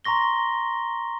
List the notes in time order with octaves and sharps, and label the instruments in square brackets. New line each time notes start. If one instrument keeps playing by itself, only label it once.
[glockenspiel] A#5 C6 C#6 A#6 G7